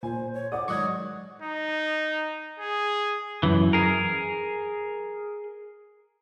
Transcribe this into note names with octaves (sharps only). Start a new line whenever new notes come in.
A#2 C5 G#5
C#5
D5 F#5 D6 D#6
G#2 D#3 F#3 C#6 D#6 F#6 G#6
D#4
G#4
F#2 E3
G#4 A#4